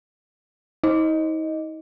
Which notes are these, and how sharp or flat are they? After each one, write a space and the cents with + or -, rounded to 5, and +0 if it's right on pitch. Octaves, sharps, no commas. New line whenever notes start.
D#4 +45 D#5 +0